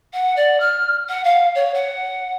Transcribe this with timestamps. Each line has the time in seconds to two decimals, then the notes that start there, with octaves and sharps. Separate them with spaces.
0.13 F#5
0.36 D5
0.60 F6
1.09 F#5
1.24 F5
1.55 C#5
1.74 F#5